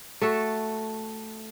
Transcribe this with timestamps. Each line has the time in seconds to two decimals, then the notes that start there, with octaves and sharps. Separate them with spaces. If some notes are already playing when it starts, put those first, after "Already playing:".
0.21 A3 F#4 A4